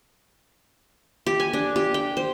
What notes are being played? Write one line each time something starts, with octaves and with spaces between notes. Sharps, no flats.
G4
G#5
D4
G4
G5
C5